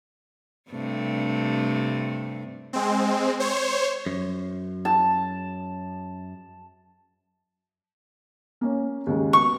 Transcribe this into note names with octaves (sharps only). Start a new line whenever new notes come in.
G2 C3 A3
G#3 C4
C5 C#5
F#2
A5
A#3 C#4
D#2 C#3 G#3
F#3 B3 C#6